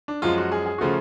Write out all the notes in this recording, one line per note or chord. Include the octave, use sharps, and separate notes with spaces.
D4
F#2 F3 G#3 F4
F#4
G#4
G#4
C#3 F3 A3 F#4